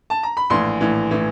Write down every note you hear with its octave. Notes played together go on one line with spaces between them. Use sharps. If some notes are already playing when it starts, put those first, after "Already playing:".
A5
A#5
B5
A#1 A2 E3 C6
A#1 A2 E3
A2 E3